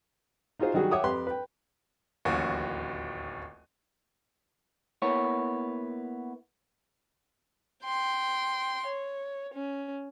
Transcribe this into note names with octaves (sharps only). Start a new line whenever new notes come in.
D#4 F4 F#4 G#4 C5
D#3 F#3 G3 F#4 G#4
C#5 E5 F#5 G5 D6 D#6
F2 G4 B4 C6
B4 G5
D1 A1 D#2 C#4 F4 F#4
A#3 B3 E4 C#5
G5 C6
C#5
C#4